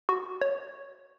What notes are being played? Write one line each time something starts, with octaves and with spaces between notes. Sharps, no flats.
F#4
C#5